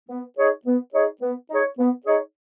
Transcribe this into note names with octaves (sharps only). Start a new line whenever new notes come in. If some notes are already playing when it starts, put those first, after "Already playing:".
B3
D#4 G#4 C#5
B3
D#4 G#4 C#5
B3
D#4 G#4 C#5
B3
D#4 G#4 C#5